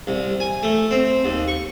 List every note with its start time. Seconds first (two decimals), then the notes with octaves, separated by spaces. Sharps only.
0.07 C2
0.40 G#5
0.63 A3
0.91 C4
1.25 D#2
1.48 C#6